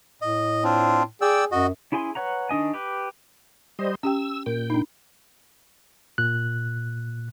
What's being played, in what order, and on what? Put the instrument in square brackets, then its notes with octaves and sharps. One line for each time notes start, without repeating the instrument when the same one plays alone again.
[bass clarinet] A2 [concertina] D#5
[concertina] C4 D4 F4
[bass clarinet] G#4 [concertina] D5 G5 E6
[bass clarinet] F#2 [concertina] F#4 D#5
[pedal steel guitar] C#4 E4 G#4 G#5 C6
B4 C#5 F#5 A#5
D#3 D4 D#5 G#5
G4 B4
[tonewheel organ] G3 C5 D#5
[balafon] C#4 G4 G5 [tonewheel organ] E6
[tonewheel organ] A#2 G5 [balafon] A#4
[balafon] D4 D#4
[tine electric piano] A#2 F#6